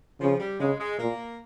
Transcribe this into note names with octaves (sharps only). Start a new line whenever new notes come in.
C#3 F3
G3
C#3 G#3
G#3
A#2 A#3